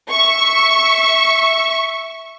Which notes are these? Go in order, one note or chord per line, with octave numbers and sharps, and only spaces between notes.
E5 C#6